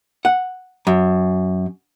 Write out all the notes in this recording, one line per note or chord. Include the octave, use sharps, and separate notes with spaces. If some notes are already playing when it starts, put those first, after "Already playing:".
F#5
F#2